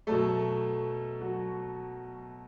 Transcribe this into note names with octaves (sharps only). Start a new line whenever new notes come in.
B2 F#3 A3 A4
F#3 F#4